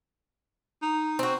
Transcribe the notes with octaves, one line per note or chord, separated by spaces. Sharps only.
D#4
C4 F#4